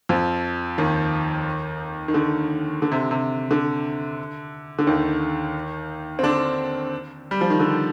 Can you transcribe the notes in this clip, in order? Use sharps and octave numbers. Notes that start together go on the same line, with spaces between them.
F2 F3
D#2 D#3
D#3
D3
D3
C3
C3
D3
D3
D#2 D#3
C4
D3 D4
G3
F3
D#3
D3